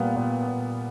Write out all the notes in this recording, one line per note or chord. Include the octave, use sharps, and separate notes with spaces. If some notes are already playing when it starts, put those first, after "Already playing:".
Already playing: A#2 G3 A#3 B3
A#2
A#2